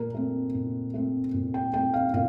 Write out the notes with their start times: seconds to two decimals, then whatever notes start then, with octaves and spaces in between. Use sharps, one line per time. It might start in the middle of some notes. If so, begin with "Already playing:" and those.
Already playing: A#2 A#4
0.14 A3 C4
0.54 A#2
0.94 A3 C4
1.34 A#2
1.54 G5
1.74 A3 C4 G5
1.94 F5
2.14 A#2 F5